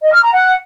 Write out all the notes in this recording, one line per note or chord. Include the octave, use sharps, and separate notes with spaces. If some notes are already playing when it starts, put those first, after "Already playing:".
D#5
F6
A#5
F#5